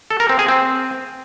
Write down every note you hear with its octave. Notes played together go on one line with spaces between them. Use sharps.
A4
A#4
C4
G#4
C4